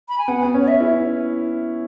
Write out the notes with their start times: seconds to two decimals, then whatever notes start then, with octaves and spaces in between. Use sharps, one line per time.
0.09 B5
0.18 G#5
0.28 B3 F#5
0.42 B3
0.54 C#4
0.60 C#5
0.68 E5
0.81 E4